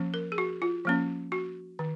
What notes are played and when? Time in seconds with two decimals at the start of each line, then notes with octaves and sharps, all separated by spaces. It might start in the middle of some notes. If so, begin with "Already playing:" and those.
Already playing: F3 A#3 C#4
0.14 A#4
0.32 G#4
0.38 F#4
0.62 F4
0.85 F3 A#3 C#4
1.32 F#4
1.79 D#3